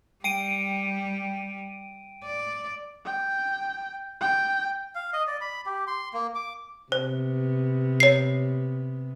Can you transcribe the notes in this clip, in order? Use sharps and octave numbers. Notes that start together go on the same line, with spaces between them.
G3 G5 D7 D#7
D5
G5
G5
F5
D#5
D5
B5
G4
C6
A#3
D6
C3 B3 C5
C#5 C7